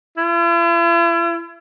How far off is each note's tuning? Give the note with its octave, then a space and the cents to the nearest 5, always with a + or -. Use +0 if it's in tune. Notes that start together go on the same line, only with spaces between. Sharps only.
E4 +45